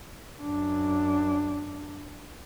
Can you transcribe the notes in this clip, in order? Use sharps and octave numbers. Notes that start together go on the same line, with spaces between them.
F#2 D4